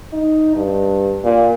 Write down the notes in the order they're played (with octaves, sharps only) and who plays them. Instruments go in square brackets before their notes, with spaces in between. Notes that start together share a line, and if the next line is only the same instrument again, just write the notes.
[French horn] D#4
G2
A#2